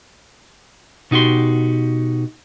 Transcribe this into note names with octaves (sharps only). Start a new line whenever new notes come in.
B2 D#4 F#4 G4 C6